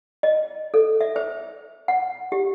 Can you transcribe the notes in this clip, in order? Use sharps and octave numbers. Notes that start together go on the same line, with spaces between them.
D#5
A4
E5
C5
F#5
G4